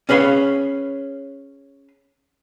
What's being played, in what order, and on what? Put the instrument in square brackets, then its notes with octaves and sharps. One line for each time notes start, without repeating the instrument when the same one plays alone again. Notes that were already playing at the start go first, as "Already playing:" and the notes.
[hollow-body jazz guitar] C#4 G#4 B4 C#5 F5